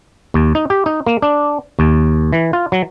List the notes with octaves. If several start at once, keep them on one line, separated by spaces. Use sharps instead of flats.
D#2
D#4
G4
D#4
A#3
D4
D#2
E3
F4
F#3